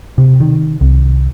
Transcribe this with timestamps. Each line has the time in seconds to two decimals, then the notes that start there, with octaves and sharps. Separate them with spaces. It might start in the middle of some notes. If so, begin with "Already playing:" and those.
0.18 C3
0.40 D#3
0.81 C2